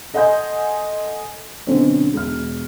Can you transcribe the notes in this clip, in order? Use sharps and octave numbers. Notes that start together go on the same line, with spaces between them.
A4 D#5 F#5 G#5 C6 G6
B2 D3 F#3 C4 C#4
E1 F6